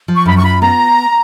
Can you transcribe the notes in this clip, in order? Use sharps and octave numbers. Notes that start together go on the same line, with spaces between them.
F3
C#6
F#2 B5
C#6
F4 B5
B3 A#5